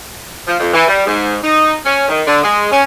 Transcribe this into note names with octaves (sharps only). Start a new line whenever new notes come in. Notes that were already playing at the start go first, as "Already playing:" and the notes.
F3
F2
E3
G3
G#2
D#4
C#4
D#3
D3
G#3
C#4